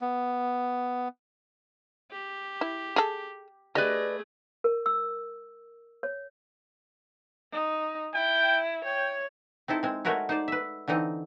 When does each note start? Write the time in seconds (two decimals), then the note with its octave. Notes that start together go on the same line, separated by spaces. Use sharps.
0.01 B3
2.11 G4
2.61 E4
2.96 G#4 A4
3.75 A3 G4 G#4 B4 D5 D#5
4.64 A#4
4.86 E6
6.03 C#5
7.53 D#4
8.14 E4 G5
8.85 C#5 G5
9.68 C4 D#4 E4 A4
9.83 G#3 C4
10.05 G#3 A3 F#4 A#4 B4 C#5
10.29 D#4 C5 D5
10.48 B4 E5
10.88 D3 E3 C4 D#4